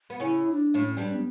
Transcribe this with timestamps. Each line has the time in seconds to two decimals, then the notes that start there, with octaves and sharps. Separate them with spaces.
0.10 B3
0.20 C#3 C#4 E4
0.51 D4
0.74 A2 A3
0.82 C#4
0.97 G2 G3
1.07 C#4
1.14 B3